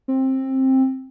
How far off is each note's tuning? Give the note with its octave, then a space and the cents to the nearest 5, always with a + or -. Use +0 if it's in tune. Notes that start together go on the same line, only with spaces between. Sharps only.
C4 +15